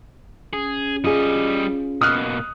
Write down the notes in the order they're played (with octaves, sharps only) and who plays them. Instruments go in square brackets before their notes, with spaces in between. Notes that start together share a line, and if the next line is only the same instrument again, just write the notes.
[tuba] C#4 [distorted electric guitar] G#4
[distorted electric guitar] G3 D#5 [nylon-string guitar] F4 G#4
[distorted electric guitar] B2 A#3 [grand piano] D#6 F6 F#6